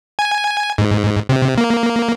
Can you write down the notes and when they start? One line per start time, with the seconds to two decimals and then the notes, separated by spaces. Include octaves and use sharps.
0.19 G#5
0.78 G#2
1.29 C3
1.58 A#3